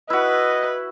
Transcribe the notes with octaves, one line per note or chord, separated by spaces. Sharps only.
E4 F#4 B4 D#5